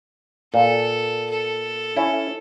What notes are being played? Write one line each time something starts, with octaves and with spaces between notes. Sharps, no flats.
A#2 A4
A4
C#4 E4